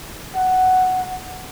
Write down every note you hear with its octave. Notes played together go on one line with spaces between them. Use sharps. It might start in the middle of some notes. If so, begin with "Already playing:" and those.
F#5